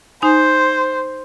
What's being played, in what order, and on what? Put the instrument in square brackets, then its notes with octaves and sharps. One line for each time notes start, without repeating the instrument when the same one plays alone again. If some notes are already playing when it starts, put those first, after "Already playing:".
[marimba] D#4 G#5 [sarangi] C5